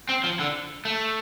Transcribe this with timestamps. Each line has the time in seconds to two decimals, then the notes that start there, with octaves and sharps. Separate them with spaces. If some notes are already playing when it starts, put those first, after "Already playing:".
0.09 C4
0.24 F3
0.40 D3
0.85 A3